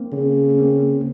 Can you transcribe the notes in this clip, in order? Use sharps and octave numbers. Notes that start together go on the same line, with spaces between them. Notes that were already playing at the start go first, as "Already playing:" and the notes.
Already playing: A#3 C4
C#3
A#3 C4